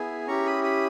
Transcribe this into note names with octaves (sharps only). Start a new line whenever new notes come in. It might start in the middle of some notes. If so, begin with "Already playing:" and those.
Already playing: B3 E4 G#4
C#4 E4 G4 A#5 C#6
B5 D#6
B5 D#6